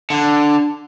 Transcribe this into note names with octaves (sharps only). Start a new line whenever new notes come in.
D3